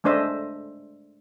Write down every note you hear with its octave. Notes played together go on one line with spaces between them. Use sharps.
G#3 A3 D4 C5 D#5 E5